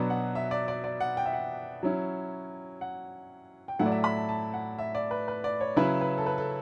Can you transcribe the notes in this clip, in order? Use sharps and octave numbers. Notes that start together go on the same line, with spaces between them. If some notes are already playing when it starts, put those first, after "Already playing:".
Already playing: B2 F#3 B3 D4
F#5
E5
D5
D5
D5
F#5
G5
E5
F#5
F#3 C#4 E4
F#5
G5
A2 F#3 A3 E4 F#5
D5
E5
B5
A5
A5
F#5
E5
D5
B4
B4
D5
C#5
C#3 F#3 C#4 E4 B4
B4
A4
B4
A4